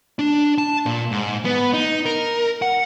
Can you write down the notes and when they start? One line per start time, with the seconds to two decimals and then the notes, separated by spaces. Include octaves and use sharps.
0.19 D4
0.58 A5
0.86 A#2
1.11 G#2
1.45 B3
1.73 D#4
2.06 A#4
2.62 F#5